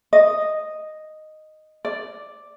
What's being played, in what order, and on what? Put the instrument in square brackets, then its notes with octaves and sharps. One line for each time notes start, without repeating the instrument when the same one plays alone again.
[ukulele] D#5
D5